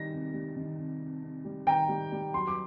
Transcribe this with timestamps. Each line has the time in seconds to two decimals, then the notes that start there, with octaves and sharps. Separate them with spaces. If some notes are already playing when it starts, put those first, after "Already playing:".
Already playing: D#3 G3 A#6
0.12 C3
0.34 G3
0.56 D#3
0.77 C3
1.00 C3
1.23 C3
1.45 G3
1.67 D#3 G5 A#5
1.89 G3
2.12 G3
2.34 F#3 C6
2.48 D6